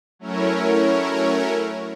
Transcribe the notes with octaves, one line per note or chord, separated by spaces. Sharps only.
F#3 A3 C#4 E4 A#4 C#5